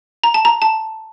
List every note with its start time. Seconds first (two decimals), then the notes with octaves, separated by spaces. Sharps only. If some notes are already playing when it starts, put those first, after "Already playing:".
0.24 A#5
0.34 A5
0.45 A#5
0.62 A5